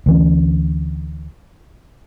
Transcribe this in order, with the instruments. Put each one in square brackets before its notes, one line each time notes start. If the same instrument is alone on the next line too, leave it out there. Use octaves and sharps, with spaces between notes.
[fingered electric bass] D2 E3 C#4